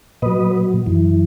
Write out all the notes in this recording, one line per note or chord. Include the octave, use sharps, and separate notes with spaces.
A#2 F#3 B4 D#5
F#2 E3